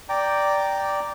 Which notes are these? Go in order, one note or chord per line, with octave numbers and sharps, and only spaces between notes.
D5 G5 A#5